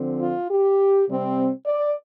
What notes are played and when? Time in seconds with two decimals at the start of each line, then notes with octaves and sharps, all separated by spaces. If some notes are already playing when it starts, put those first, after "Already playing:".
Already playing: D3 F3 C4
0.21 F4
0.51 G4
1.08 C3 G3 C4
1.66 D5